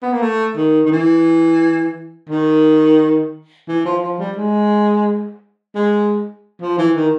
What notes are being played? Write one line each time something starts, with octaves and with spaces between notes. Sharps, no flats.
B3
A#3
A3
D#3
D#3
E3
D#3
E3
F3
F3
G3
G#3
G#3
F3
E3
D#3